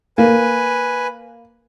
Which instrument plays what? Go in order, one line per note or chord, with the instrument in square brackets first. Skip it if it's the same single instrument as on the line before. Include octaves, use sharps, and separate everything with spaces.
[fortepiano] A#3 [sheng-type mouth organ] B4 G#5